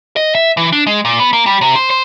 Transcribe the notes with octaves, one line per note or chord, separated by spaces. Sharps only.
D#5
E5
E3
D4
G#3
A#2
B3
A#3
G3
C3
C5
C5